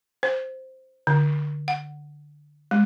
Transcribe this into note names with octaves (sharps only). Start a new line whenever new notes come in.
C5
D3
F#5
G#3